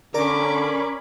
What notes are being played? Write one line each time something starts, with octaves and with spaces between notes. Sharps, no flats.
D3 C#4 A#4 D5 A#5 B5 C#6 D6